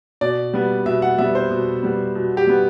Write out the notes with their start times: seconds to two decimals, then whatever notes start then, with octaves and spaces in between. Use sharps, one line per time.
0.21 B2 D5
0.53 G3 B3
0.86 B2 E5
1.02 F#5
1.18 G3 B3 E5
1.35 C5
1.50 B2
1.83 G3 B3
2.15 B2
2.37 G4
2.47 G3 B3